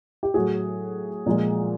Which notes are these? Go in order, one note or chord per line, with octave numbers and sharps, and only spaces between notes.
G4
A2 F#3 F#4 G#4
A#2 F3 G#3